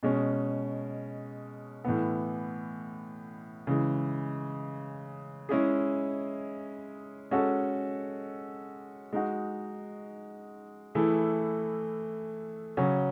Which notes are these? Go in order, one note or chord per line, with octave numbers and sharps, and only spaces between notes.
B2 G#3 C#4
A2 E3 B3
C#3 E3 G#3
G#3 C#4 E4 G#4
G#3 C#4 F#4 A4
G#3 D#4 F#4
E3 A3 E4 G#4
C#3 F#3 C#4